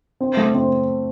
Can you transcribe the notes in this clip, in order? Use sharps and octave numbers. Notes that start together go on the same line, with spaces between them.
C4
A3
C4